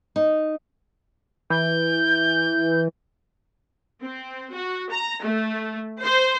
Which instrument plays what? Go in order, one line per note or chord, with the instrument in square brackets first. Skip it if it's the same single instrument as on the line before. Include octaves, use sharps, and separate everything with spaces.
[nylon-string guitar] D#4
[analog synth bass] E3 [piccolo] G6
[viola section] C4
F#4
A#5
A3
C5